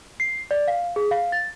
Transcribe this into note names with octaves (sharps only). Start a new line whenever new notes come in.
C7
D5
F5
G#4
F5
A6